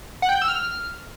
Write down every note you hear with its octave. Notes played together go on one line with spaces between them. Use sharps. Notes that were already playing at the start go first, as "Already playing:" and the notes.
F#5
G5
G6
E6
F6